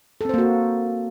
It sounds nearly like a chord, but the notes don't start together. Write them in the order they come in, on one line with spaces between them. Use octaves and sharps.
A4 C4 C5 A#3 F#4